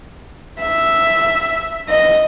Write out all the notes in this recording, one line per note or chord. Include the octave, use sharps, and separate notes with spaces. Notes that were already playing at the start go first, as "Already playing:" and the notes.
E5
D#5